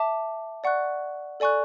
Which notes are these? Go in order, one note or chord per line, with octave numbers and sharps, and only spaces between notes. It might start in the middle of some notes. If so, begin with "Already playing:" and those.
Already playing: E5 A5 D6
D5 F#5 C#6 F#6
A4 D5 G#5 C#6 F#6